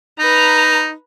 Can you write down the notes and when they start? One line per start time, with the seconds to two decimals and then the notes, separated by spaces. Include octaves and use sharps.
0.19 D#4 B4 A#5